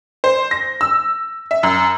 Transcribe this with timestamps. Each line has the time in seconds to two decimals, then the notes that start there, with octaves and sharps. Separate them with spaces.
0.24 C5
0.51 A#6
0.81 E6
1.51 E5
1.63 F#2